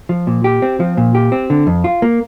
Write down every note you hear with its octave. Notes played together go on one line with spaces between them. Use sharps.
F3
A#2
G4
C4
F3
A#2
G4
C4
D3
F2
F4
A#3